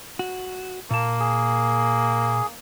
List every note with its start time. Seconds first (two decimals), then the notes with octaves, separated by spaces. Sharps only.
0.19 F#4
0.91 A#2 A#3 A5
1.20 G#4